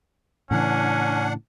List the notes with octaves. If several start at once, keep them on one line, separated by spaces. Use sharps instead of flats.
A2 C#3 E3 C#4 D4 F#5